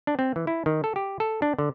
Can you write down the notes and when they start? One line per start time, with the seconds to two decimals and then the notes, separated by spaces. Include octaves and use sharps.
0.07 D4
0.19 C4
0.36 E3
0.47 E4
0.66 D#3
0.84 A4
0.96 G4
1.20 A4
1.42 D4
1.58 D3